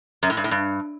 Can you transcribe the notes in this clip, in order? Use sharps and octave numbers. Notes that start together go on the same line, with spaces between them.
F#2
A2
G2
A2
G2